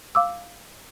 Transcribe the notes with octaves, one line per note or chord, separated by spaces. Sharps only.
F5 D6 E6